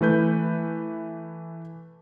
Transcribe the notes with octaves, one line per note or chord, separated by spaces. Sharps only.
E3 A3 B4 G6